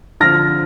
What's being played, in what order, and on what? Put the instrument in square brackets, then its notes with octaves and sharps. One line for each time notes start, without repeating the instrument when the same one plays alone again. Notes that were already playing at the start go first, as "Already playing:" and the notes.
[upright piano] D3 F3 C4 [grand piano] F6 A#6